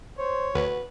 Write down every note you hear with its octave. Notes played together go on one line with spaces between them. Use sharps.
C5 C#5
D2 F#4 B4